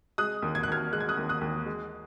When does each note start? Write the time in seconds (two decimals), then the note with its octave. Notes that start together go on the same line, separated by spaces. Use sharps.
0.18 G#3 D#6 F#6
0.42 D#2
0.55 G#6
0.63 F#6
0.68 D#2 F6 G#6
0.93 G#3 F#6
1.00 G#6
1.09 D#6 F#6
1.17 D#2
1.29 D#6 F#6
1.41 D#2
1.66 G#3